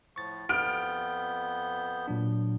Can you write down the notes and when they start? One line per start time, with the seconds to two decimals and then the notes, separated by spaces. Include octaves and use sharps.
0.16 A2 F3 C#6 A6
0.49 F2 B3 F6 G6 D7
2.08 A#2 F#3 D4